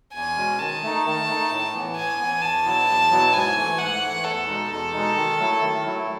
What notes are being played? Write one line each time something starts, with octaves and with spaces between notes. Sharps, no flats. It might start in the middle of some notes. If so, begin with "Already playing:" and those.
E2 G#5
B2 G#3 C#4
D#3 A5
A3 D#4
D#3
A3 D#4
A2
E3 B3
A2 G#5
E3 B3
E2 A5
B2 F#3 B3 E4
E2
B2 F#3 B3 E4
G#2 G#5
E3 A3
G#2 F#5
E3 A3
E2 A4
B2 G#3 D#4
E2 A4
B2 G#3 D#4
D#3
F#3 A3 E4
D#3
F#3 A3 E4